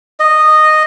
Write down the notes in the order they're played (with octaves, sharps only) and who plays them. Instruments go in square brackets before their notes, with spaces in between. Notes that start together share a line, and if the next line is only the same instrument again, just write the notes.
[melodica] D#5